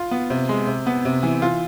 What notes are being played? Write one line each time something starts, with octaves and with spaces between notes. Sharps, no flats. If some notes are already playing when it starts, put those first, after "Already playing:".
Already playing: F4
B3
C3
G#3
C3
B3
C3
E3
F4